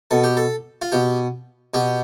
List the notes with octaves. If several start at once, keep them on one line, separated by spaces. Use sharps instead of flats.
B2 A4
G4
A4
F4
B2 G4
B2 G4